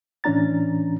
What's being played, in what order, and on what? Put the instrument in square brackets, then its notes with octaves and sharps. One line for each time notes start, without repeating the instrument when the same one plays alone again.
[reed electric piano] A2 E3 C#4 D4 A#5 A6